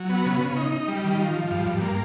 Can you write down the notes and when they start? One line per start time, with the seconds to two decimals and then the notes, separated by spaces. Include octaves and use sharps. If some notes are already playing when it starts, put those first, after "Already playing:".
Already playing: F#3
0.09 B3
0.26 C#3
0.41 C#3
0.56 D#4
0.72 D#4
0.88 G3
1.04 D#3
1.20 F3
1.35 F3
1.51 G2
1.67 G2
1.82 A#3